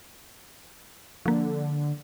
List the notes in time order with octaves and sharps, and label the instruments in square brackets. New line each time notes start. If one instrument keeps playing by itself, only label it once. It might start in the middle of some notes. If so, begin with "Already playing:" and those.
[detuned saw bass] D3 [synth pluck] F3 A#3